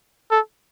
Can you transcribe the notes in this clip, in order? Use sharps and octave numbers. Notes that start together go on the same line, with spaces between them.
A4